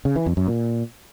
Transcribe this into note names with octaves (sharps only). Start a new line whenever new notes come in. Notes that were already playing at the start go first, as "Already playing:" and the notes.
C#3
E3
F2
F#2
A#2